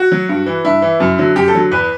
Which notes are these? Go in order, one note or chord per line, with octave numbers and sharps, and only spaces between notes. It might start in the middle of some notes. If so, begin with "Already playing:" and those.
Already playing: F#4
F#3
G2
E3
G2 E4
E3
F#2
D3 F#3
F#2 G4
A4
D3 F#3
E2 B4